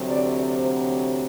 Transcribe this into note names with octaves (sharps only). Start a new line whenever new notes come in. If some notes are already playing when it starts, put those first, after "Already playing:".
Already playing: D2 C3 F#3 C4
D5
C5